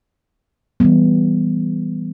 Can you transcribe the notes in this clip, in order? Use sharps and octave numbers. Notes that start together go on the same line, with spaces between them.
E3 G3 B3